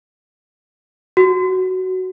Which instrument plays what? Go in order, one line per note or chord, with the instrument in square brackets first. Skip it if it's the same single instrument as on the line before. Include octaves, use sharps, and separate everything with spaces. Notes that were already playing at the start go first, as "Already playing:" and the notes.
[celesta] F#4